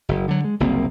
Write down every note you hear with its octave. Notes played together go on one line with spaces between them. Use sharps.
F#1
D3 F#3
G#3
F#1 C2 A#3 C4